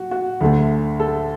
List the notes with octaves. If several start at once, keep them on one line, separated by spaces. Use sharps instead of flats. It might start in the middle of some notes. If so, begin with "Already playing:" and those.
Already playing: F#4
F#4
D2 D3 A3
A4